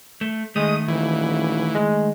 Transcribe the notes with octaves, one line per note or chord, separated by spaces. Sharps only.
A3
D#3 G#3 A3 D#6
D#1 E3
G#3